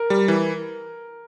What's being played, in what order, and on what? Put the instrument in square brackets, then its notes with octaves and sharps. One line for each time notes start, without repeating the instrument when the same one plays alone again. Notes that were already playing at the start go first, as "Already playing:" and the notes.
Already playing: [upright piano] A#4
[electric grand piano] G3
E3